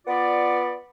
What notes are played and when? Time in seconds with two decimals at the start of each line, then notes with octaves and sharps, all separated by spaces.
0.07 B3 F4 D5